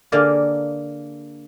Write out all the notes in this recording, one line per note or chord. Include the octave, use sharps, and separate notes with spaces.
D3 A#3 G#4 A#4 D5